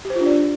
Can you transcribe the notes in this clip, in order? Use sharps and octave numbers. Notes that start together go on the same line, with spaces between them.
G4
C5
F4
D4
D5